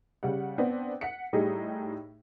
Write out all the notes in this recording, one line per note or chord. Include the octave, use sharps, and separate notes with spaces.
C#3 G3 F#5
B3 C4 D4
F#5 B6 C#7
A2 G3 D#4 G4 G#4